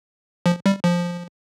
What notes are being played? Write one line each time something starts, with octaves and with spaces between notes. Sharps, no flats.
F3
G3
F3